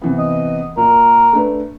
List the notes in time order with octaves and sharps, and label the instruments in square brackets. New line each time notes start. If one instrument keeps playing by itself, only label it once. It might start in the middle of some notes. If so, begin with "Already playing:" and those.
[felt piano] C3 E3 B3
[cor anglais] D#5
[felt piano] A#2 [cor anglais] A#4
[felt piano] A3 D4 B4